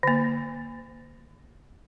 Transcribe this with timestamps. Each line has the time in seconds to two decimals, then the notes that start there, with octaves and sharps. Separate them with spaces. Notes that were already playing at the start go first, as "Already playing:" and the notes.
0.03 D3 A#3